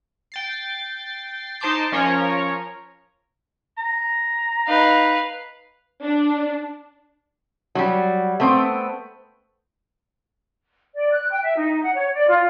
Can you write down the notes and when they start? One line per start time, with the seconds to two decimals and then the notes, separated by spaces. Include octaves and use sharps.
0.32 G5 A6 C7
1.60 D#4 C5 A5 C6 D6 C7
1.92 F3 C#4 A#4 C#5
3.78 A#5
4.68 D#4 B4 F5
6.04 D4
7.75 F#3 G3
8.40 A3 B3 C4
10.95 D5
11.12 F#6
11.31 G5
11.43 E5
11.57 D#4
11.82 F#5
11.94 C#5
12.15 D5
12.28 F4